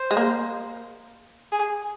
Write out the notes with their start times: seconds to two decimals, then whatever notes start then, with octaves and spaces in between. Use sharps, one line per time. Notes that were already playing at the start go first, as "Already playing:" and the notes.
Already playing: C5
0.11 G#3
0.17 A#3
1.52 G#4